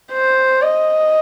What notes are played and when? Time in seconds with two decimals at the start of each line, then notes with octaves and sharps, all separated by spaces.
0.12 C5
0.62 D#5